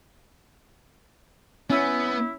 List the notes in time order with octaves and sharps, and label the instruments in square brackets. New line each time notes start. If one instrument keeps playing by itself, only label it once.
[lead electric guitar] B3 [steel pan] C#4 [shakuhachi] E4